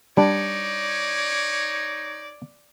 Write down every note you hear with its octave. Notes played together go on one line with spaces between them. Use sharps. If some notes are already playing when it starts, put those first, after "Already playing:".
G3 D4 D#4 C#5 D5